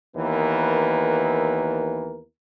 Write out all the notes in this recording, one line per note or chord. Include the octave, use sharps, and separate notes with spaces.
D#2 E3 B3 A#4